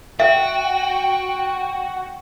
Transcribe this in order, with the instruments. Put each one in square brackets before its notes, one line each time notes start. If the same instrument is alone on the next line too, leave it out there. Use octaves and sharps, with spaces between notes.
[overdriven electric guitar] F#4 [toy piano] E5 [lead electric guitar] G5